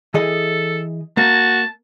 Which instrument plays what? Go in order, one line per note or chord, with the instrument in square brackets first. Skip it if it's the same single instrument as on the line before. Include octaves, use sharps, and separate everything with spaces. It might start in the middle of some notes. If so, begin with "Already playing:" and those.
[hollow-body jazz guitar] E3 G#4 D#5 [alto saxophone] A4
[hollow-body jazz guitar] A#3 [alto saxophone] F#4 [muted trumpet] A5